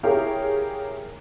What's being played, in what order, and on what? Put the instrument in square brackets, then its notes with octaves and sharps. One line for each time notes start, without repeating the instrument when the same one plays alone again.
[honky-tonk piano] E4 G4 G#4 A#4 C#5 F5